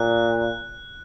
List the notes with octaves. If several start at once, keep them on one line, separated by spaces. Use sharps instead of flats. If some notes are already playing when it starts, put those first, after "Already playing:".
Already playing: A#2 F#6